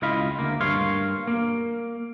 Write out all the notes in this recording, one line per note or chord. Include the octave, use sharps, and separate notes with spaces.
C#2 E4 F4 D#5 F5 B5
D2 A#3
G2 A#3 C#5 F5 C6
A#3